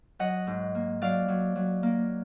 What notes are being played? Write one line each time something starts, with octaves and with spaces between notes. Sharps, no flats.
F#3 D#5 F#5
G#2
A#3
F#3 D5 F5
F#3
F#3
A#3